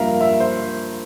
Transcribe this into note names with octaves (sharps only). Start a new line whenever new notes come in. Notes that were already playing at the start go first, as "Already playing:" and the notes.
Already playing: G2 F3 A#3 A#4 E5 F5
E5
C5